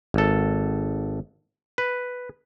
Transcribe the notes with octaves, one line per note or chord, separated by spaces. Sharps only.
G#1 A4
B4